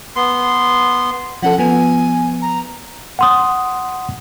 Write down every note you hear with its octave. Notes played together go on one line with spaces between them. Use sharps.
B3 C6
F3 C#4 A4 F#5
F3 B3 G#5
A#5
F#5 C6 D#6